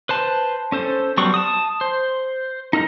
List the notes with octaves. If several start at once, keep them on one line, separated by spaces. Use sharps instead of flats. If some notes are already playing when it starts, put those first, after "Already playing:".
B4 C5 A5
C#4 A4 C5
F#3 G3 B3 C4 C#6
A5 D#6
C5
D#4 A4 A#4 D#5